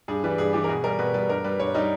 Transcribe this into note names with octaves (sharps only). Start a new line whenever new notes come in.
G2 G#4
E3 G3 B4
G2 G#4
E3 G3 G4
A#4
B2 G#4
G3 A#4
B2 B4
G3 B4
G2 A#4
G3 B4
G2 C#5
G3 D#4